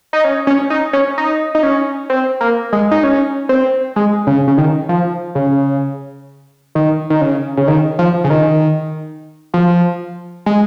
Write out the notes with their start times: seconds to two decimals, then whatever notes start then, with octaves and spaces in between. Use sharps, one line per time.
0.13 D#4
0.24 C#4
0.47 C#4
0.70 D#4
0.93 C#4
1.18 D#4
1.55 D#4
1.63 C#4
2.10 C4
2.41 A#3
2.73 G#3
2.91 D#4
3.03 C#4
3.49 C4
3.96 G#3
4.27 C#3
4.47 C#3
4.57 D#3
4.89 F3
5.35 C#3
6.75 D#3
7.10 D#3
7.21 C#3
7.57 C#3
7.68 D#3
7.99 F3
8.24 C#3
8.30 D#3
9.54 F3
10.46 G#3